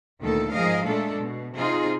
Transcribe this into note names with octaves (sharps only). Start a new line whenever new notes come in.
D2 A#2 D#3 A4
G#2 F3 G#4 A#4 D#5 F5
A#2 G#3 A3 D4 A4
B2
C3 D#4 F4 G#4